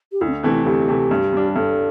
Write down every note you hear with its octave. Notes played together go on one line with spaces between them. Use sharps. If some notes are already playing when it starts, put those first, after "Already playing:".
G4
D2 E4
C4
D4
C3 E3 A3 D4
E4
D2 G4
C3 E3 A3
G2
G3 D4
G2 A4